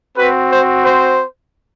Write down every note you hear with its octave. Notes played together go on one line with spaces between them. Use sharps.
C4 F#4 B4
C5
C5